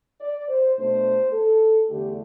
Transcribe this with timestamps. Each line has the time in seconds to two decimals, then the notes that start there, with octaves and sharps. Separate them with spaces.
0.20 D5
0.48 C5
0.76 B2 A3 D4 C5
1.32 A4
1.88 E2 D3 A3 D4 G4